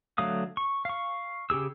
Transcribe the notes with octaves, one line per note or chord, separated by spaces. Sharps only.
D3 F#3 A3 F5 D#6
C#6
F5 C#6
C#3 G4 G#4 E6